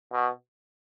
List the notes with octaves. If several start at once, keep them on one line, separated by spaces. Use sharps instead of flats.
B2